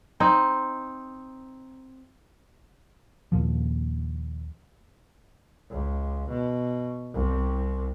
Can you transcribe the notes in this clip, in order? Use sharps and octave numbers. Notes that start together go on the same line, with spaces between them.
C4 D#4
D#2 A#2 F3
C#2
B2
C2